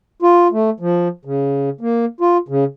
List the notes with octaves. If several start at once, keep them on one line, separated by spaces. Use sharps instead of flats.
F4
A3
F3
C#3
A#3
F4
C#3